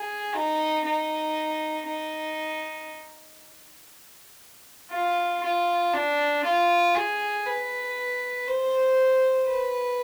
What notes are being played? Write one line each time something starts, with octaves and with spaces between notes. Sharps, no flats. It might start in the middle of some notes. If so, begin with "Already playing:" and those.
Already playing: G#4
D#4
D#4
D#4
F4
F4
D4
F4
G#4
B4
C5
B4